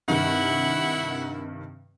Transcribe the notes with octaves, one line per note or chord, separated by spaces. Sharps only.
G2 C3 D#3 E4 F#5